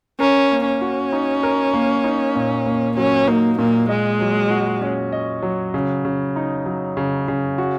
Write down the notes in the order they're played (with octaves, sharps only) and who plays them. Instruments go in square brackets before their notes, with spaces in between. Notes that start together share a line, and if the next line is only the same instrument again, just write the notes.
[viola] C#4 [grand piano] A#4
[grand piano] A#3
[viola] C#4
[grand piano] F#4
D#4
A#4
A#3
D#4
A#2
A#3
[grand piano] F#3 [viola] C#4
[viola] A#3 [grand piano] D#4
[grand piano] A#2 [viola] A#3
[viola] G#3 [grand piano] D#5
[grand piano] F#3
F#4
C#4
D#5
F#3
C#3
C#3
D#4
F#3
C#3
C#3
F#4